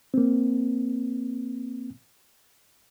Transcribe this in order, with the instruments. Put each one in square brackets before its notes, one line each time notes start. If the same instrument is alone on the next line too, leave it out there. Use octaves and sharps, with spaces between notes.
[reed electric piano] A#3 C4